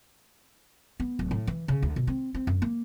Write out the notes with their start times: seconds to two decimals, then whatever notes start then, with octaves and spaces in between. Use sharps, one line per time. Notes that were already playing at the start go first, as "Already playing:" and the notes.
1.00 B3
1.19 D1
1.31 A2
1.47 E3
1.68 C#3
1.83 D2
1.96 B2
2.07 C4
2.35 C4
2.47 F#2
2.62 A#3